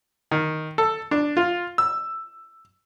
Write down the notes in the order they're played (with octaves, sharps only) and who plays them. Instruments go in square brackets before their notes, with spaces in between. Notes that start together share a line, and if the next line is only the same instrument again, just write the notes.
[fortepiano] D#3
A4
D4
F4
E6